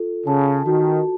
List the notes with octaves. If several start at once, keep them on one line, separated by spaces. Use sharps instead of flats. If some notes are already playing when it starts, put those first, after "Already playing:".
Already playing: F4 A4
C#3 A5
D#3 F#4